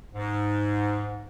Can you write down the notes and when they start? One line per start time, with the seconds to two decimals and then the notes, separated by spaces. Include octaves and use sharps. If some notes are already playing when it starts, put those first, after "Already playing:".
0.14 G#2